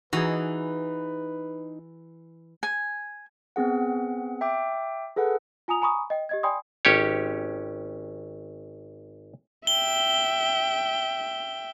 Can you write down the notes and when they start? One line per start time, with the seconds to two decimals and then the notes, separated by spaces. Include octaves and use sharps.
0.13 E3 D#4 F#4 G#4 B4
2.63 G#5
3.56 B3 C4 G#4 F#5
4.41 E5 G5 D6
5.16 G#4 A4 B4 F#5
5.68 F4 G#5 A#5 D#6 F7
5.82 G#5 A#5 B5 C#6 D#6
6.10 D#5 G5
6.29 G4 D#5 G#6
6.43 D5 G5 G#5 B5 C6 D#6
6.85 G#1 C#4 G4 C#5
9.67 E5 G5 G7